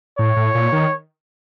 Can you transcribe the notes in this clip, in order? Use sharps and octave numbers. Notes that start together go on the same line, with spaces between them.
A2 C#5
A2
A#2
D#3